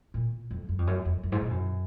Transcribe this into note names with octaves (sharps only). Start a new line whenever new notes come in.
A#2
F2
F#2
F2
F#2
F2
F#2
G#2
A#2
F#2